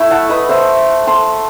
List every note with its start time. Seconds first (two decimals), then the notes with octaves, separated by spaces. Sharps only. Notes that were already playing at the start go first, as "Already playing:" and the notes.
Already playing: A3 E4 E5
0.10 F#5 A5
0.29 B4 D#5
0.49 C5 E5
1.07 A5 C6